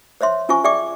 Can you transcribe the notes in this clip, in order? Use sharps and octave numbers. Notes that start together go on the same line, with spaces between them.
C5 C#5 E5 C6
C#4 F4 C5 G#5 C#6
G#4 D5 E5 G5 C#6 D6